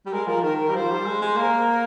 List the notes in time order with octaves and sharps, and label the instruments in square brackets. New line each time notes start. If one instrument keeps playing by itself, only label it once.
[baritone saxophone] G3
[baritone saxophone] G#3 [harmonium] A#4
[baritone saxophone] F3 [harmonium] A#4
[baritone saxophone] D#3 [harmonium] A#4
[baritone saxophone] G3 [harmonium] A#4
[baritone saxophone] F3 [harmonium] C5
[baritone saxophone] G3
G#3
G#3
[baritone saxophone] A#3 [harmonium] A#4
[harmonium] A#4